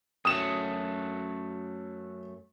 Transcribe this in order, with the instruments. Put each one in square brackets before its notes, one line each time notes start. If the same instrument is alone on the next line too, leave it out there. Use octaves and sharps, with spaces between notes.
[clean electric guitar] F#2 F#3 A3 [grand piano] D#6 E7